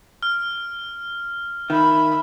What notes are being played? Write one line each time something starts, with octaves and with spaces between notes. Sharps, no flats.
F6
D#3 E5 B5